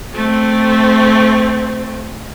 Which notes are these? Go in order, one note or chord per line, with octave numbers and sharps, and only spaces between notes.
A3 C4